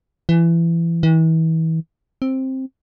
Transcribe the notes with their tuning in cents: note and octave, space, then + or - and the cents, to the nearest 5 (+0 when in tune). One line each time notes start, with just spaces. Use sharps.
E3 +25
E3 -35
C4 +10